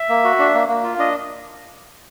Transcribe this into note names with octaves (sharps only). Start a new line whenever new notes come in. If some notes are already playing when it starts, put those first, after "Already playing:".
Already playing: E5
A#3
F#4
D4
A#3
A#3
F4
D4 D#5